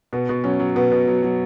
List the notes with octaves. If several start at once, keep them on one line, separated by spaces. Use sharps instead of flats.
B2 B3
B2
F#3 C#4
F#3
B2 B3
B2
F#3
F#3